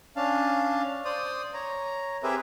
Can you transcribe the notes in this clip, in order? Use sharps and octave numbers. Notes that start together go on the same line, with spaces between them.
C#4 D4 F5 A5
C5 D5 D#6
C#5 A#5
C4 G4 G#4 A#4 B4 E5